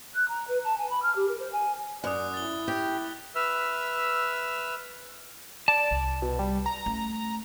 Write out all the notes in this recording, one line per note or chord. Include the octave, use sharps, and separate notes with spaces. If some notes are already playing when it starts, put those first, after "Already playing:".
F#6
A#5
B4
A5
G#5
B5
F6
G4
A#4
C5
G#5
F#2 D5 D#6 F#6
E4 A6 G7
G4
B4 E5 E6 F6
D5 A5
C2
B2
G3
A#5
A3 C#4